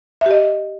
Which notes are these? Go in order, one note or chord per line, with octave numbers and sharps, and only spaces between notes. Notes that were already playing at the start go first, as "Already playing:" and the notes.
G4 D#5 E5